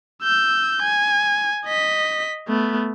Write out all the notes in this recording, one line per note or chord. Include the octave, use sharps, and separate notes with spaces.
E6 G6
G#5
D#5 B6
A3 B3